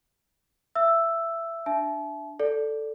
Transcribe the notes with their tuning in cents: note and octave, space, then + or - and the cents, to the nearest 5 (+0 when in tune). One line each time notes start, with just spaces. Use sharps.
E5 +20 E6 +5
D4 +0 E5 +10 A5 -40
A4 +0 D5 +0